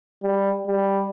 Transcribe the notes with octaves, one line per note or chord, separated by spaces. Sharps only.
G3
G3